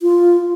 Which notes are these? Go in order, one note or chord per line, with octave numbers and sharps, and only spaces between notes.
F4